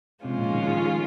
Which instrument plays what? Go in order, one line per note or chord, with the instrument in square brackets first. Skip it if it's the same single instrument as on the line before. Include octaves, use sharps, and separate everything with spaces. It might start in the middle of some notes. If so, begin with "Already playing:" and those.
[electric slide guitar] C3 [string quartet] F3 G#3 C#4 F4
[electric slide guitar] A#2
D#3
D#3